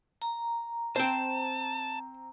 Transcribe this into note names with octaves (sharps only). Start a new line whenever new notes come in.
A#5
C4 C5 G5 A5